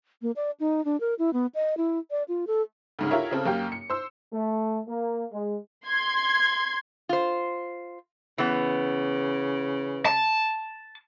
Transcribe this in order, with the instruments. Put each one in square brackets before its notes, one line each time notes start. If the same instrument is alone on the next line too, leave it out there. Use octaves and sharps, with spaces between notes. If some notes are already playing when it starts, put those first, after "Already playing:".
[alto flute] A#3
D5
D#4
D4
A#4
E4
B3
D#5
E4
D5
F4
A4
[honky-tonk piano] D2 G#2 C#3
E4 F4 G4 A#4 C#5 E5
C#3 C4 A4
F#2 A#3 G4 G5
C#7
C5 E6
[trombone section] A3
A#3
G#3
[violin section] C6 G#6
[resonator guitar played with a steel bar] F4 C5
[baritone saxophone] C#3 [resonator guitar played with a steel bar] E3 B3
[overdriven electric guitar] A5